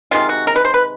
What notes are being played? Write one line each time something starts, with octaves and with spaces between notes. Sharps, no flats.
C3 D#3 G#3 F4
F#4
A#4
B4
C5
B4